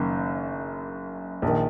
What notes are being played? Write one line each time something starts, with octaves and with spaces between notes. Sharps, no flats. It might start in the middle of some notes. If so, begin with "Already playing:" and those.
Already playing: F#1 F#2 D#3
A#1 D#3